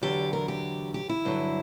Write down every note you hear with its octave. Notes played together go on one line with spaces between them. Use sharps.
E2 D3 F#3 G4
A#4
G4
G4
E4
G2 D3 F#3